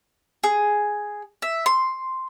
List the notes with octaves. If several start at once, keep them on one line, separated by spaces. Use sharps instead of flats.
G#4
E5
C6